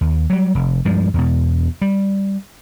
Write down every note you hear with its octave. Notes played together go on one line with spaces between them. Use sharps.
D#2
F#3 G3
F1
G2 F3 G#3
E2 B2
G3